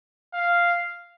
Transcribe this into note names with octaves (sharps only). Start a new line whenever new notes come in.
F5